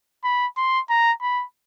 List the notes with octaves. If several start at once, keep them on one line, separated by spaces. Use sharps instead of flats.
B5
C6
A#5
B5